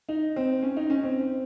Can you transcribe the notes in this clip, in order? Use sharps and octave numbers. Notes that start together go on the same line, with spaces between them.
D#4
C4
C#4
D#4
C#4
C4